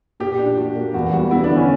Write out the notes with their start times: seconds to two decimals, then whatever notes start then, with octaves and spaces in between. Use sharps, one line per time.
0.20 A#2 G4
0.38 D4
0.57 F#4
0.76 A#3
0.94 E2 F#4
1.13 G3 F#4
1.31 B3 E4
1.44 D4
1.50 D3
1.56 C#4